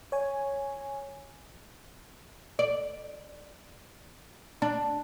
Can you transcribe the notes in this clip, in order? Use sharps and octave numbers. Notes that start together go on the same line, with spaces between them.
C#5 G#5
D5
D4